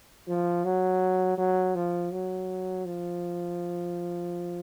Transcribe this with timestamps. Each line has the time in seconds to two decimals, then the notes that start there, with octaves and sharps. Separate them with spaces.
0.28 F3
0.64 F#3
1.38 F#3
1.75 F3
2.12 F#3
2.85 F3